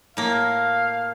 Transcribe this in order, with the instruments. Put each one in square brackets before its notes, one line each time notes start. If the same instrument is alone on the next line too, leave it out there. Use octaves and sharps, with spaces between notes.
[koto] A2 A#3 [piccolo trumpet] F5